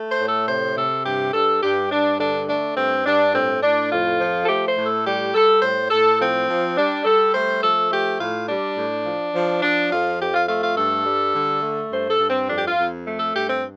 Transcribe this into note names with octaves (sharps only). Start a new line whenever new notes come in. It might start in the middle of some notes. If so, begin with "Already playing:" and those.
Already playing: A3
C5
A2
A4
C3 C5
C3 A4
G2 G4
G2 A4
G2 G4
G2 D4
D3 D4
A3 D4
G2 C4
G2 D4
A2 C4
A2 D4
F2 F4
F3
A4
A3 G4
C5
A2
A4
G3 G4
G3 A4
A2 C5
A2 A4
F3 C4
F3
G3 D4
G3 A4
A3 C5
F3 A4
A3 G4
A2 F4
G3 D4
A2
F3
F3
F3 D4
F2 F4
F2 G4
F4
A3 F4
F4
G2 A4
G3
D3
A3
G2 C5
A4
G2
C4
F2 D4
G4
F4
F2
A3
A4
G2 G4
C4